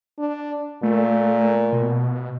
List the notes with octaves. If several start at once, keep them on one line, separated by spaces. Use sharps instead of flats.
D4
A#2 A3
B2